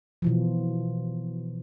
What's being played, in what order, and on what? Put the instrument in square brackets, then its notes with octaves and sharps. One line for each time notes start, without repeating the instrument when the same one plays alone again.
[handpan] B2 E3 F3